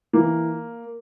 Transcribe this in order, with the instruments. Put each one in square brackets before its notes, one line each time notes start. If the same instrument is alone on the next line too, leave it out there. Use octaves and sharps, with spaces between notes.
[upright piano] E3 A#3